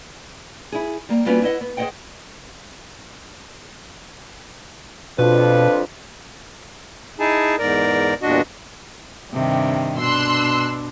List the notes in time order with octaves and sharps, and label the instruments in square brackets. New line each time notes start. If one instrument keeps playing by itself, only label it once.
[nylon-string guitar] E4 G#4
G3 A#3
G3 A#3 B3 C#4 F4 F#4
E4 B4 D5 D#5 F#5
B3
G#4 C5 C#5 D#5 F#5 G5
[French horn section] F2 D4 F4 [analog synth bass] B2 [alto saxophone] B4
[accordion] D#4 E4 G#4 G#5 A5
E2 G#2 A#4 D5
E2 G2 A#2 D4 F#4 D#5
[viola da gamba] G2 C3 D#3
[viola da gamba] B2 D4 [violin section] C6 E6 F#6